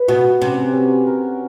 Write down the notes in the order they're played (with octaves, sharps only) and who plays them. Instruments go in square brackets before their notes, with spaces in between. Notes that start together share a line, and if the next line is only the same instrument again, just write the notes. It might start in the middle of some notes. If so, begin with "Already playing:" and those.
Already playing: [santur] B4
[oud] B2 [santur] F#4
[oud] C3 [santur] C#4
[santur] C#4
A#4